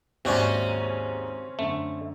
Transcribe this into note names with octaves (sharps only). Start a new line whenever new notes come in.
D#2 G#2 C3 C4 C#4 F#4 D5
F#2 D3 A3